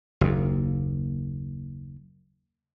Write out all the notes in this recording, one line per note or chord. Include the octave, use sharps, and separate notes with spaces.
F#1 D#2